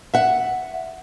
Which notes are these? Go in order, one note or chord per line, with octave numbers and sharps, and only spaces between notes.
E5 F#5